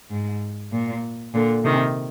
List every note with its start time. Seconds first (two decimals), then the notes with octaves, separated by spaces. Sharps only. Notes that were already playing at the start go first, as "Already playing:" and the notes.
0.11 G#2
0.72 A#2
1.34 A#2 D3
1.65 C3 D#3